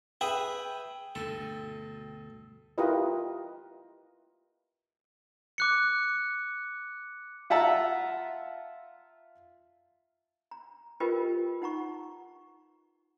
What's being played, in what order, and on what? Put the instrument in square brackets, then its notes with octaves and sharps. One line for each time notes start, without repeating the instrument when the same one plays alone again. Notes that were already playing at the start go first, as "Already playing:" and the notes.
[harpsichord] G#4 B4 E5 [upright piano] G5
[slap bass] D2 G2 B2 [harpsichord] A4
[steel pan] E4 F4 G4 A#4 B4 D#5
[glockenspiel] D6 F#6 C#7
[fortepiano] F4 E5 F#5 A5 A#5 E6
[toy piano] A#5
F4 G4 A#4 B4 D#5 G5
D#4 F#5 A#5 C#6